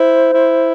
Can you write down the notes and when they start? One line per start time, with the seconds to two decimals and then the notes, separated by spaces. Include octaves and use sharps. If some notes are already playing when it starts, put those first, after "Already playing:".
Already playing: E4 C5
0.34 E4